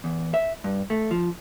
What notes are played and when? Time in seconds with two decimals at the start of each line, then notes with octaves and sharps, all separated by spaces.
0.04 E2
0.34 E5
0.64 G2
0.90 A3
1.11 F3